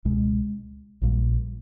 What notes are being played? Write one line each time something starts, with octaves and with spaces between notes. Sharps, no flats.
C#2 B2 G#3
A#1 A#2 G3